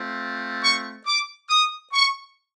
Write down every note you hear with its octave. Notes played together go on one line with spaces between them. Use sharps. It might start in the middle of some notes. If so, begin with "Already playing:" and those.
Already playing: A3 C4 F4
C#6
D6
D#6
C#6